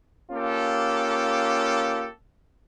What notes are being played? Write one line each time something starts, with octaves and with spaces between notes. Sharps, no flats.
A#3 C#4 F4 G4 A4